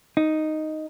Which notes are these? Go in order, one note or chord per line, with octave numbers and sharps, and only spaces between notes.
D#4